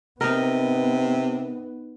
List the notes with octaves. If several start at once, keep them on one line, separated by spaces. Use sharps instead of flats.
C3 B3 D#4 A#4